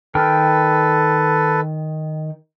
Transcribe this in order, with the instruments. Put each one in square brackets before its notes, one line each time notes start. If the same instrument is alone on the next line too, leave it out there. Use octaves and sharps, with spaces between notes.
[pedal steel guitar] D#3 G5 F6 [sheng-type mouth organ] A4 B4